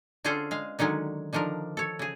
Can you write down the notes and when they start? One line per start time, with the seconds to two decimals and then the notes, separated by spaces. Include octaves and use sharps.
0.24 D3 C#4 F4 G#4 A4 C5
0.51 G#3 F5
0.79 D3 D#3 F#3 G#3 C#4
1.33 D3 D#3 F3 D4 A#4
1.77 A4 C#5
1.99 C#3 G#4